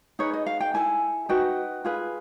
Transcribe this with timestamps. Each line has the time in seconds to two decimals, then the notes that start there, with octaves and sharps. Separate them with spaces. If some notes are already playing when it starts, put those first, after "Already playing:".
0.19 D#4 G#4 B4 C#5
0.33 D#5
0.46 F5
0.60 G5
0.74 E4 A4 G#5
1.29 D#4 F#4 B4 G5
1.85 F4 G#4 B4